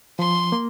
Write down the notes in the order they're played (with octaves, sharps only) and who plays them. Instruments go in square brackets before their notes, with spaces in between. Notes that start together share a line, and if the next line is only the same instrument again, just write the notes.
[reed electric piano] F3 [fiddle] C6
[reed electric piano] A#3